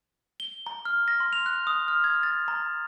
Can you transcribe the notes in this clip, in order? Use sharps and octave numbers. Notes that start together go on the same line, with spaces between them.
G7
A#5
F6
A#6
C6
F7
F#6
D#6
F6
G#6
A6
A#5